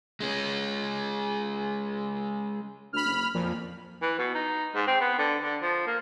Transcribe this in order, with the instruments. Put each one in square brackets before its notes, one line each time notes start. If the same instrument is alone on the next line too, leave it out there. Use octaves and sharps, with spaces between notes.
[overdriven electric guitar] G#3 C#4
[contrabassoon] D2 [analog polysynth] B5 F6
[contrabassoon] F#1
[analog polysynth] F2 [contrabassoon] A#2
[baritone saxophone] E3
B2
D#4
G#2
C4
B3
D3
D3
F3
A#3